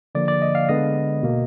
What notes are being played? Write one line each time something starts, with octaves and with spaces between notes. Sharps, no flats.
D3 F3 A#3 D5
D5
D#5
F5
D3 G#3 B3 D#5
B2 A#3